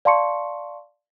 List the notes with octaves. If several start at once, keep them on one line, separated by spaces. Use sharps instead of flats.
D5 F5 A5 C6 C#6 C#7